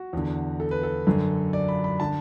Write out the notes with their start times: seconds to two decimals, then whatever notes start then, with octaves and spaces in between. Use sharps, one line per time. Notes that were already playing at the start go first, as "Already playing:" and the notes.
Already playing: F#4
0.13 E2 D3
0.60 A4
0.71 B4
0.83 A4
1.07 F#2 D3
1.53 D5
1.68 B5
1.84 B5
2.00 D3 A5